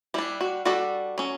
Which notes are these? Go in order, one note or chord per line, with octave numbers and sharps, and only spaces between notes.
G3 D4 E4
F#4
G3 D4 F#4 A4
F#3 C#4